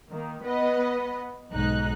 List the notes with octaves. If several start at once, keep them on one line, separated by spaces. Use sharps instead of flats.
D#3 A#3
B3 B4 D#5
B1 G#2 D#4 F#6